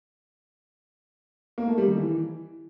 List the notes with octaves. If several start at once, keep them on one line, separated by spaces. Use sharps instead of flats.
A#3
A3
G3
D#3
E3